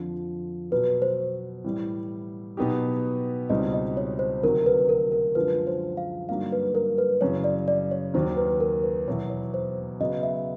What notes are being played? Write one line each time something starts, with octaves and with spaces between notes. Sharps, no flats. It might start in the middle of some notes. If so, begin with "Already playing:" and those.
Already playing: F2 D3 F3
B2 F#3 B3 B4
C5
A2 E3 G3
B2 F#3 B3 D#4 G4
C#2 B2 G3 C4 D#4 D#5
D#5
C#5
C5
D2 C3 D#3 F#3 A#4
B4
A#4
A#4
F#2 D3 F3 G#3 B4
C5
F5
G2 D3 F#3 A#3 D#4 F5
B4
A#4
B4
F#2 C#3 E3 C#5
D5
D5
C#5
D#2 D#3 F#3 C5
B4
A#4
B4
E2 B2 F#3 B3 E4 C#5
C#5
C5
C#3 F#3 B3 D#5
E5